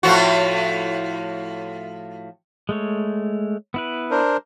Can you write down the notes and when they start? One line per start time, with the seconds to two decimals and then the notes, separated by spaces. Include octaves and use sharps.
0.03 A2 F3 F#4
2.69 G#3 A3 C#5
3.74 B3 E4 B4
4.11 D4 A#4 C5